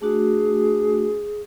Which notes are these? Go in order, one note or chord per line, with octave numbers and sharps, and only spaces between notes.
A3 D4 F#4 G#4